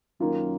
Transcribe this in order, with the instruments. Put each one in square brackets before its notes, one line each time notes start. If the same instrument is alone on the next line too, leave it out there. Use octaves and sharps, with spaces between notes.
[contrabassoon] F#2 [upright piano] D#3 A#3 F4